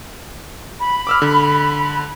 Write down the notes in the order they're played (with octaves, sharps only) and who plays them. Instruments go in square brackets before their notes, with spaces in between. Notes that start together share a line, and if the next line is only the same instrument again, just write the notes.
[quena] B5
[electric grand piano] D6 E6 F6
D3